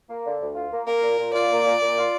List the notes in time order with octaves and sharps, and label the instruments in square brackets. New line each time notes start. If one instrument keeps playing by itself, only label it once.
[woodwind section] A#3
D3
D2
F4
A#3
[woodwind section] A#3 [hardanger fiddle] A#4
[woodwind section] A#2
A#2
[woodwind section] F4 [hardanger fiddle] D5
[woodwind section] A#3
A#2
A#2
F4